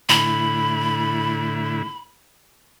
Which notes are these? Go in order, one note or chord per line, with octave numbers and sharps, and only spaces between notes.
A2 D3 E4 B5